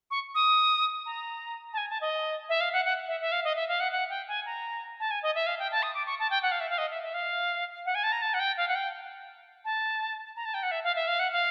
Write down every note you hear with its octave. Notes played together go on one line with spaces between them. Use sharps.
C#6
D#6
A#5
A5
G#5
A5
D#5
E5
F5
F#5
F#5
E5
E5
F5
D#5
E5
F5
F#5
F#5
G5
G#5
A#5
A5
G#5
D#5
E5
F5
G5
A5
D#6
D6
C#6
A5
G5
F#5
F5
E5
F5
D#5
E5
E5
F5
F#5
G#5
A5
A#5
A5
F#5
G5
F5
F#5
G5
A5
A#5
A5
G5
F#5
E5
F5
E5
F5
F#5
F5